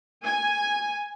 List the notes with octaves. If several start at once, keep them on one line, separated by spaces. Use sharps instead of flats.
G#5